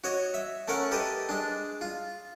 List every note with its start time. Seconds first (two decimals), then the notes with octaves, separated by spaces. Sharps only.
0.04 F#4 C#5 D#5
0.34 E5
0.68 A3 C#4 A#4 F#5
0.91 G4 A4 B4 D#5
1.29 G#3 D4
1.81 F4